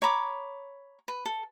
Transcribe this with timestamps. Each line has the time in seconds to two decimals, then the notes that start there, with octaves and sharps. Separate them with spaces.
0.02 C#5 A#5 B5 D6
1.08 B4
1.25 A4